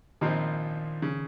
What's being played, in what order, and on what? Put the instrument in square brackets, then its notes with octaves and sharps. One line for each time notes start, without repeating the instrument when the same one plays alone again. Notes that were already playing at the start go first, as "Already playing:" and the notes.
[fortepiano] A#1 A#2 F3 C4 D#4 [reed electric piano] D#3
[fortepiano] C#3